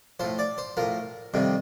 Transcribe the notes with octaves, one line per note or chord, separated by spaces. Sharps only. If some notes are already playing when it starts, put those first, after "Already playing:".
A2 F3 C5
D5
C5
A2 F3 A#4
F2 C3 D#3 G3